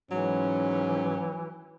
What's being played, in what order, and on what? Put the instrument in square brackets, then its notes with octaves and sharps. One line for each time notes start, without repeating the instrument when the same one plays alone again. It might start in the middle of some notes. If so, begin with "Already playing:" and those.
[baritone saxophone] G#2 [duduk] E3 [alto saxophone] F#3 [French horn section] C#4